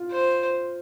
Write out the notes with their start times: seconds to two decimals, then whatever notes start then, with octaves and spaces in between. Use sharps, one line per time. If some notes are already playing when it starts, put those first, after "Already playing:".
Already playing: F4
0.11 C5